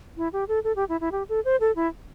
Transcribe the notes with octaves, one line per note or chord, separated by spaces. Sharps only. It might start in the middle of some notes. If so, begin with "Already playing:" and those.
E4
G4
A4
A4
G4
E4
E4
G4
A4
C5
A4
E4